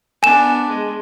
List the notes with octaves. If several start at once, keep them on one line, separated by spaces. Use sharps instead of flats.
B3 D4 G#5 E7
G#3